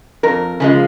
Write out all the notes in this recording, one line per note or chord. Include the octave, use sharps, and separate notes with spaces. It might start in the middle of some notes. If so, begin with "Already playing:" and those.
F2 A#4
C#3 F3 G#3